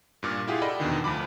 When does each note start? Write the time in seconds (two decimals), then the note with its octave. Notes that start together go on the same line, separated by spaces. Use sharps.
0.23 G2 A#2 D6 F6
0.47 E4 F4 G4 G#4 F5 F#5
0.62 A4 D5 D#5 F#5 G5 B5
0.80 E2 B2 D3 D#3
1.04 D2 F3 B5 D6